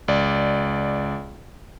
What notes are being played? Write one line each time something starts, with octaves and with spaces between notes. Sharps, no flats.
C#2 D5